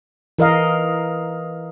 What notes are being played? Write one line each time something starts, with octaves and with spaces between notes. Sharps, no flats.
E3 A#4 D#5 F5